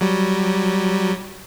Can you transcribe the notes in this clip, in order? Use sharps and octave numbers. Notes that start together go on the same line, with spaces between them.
F#3 G3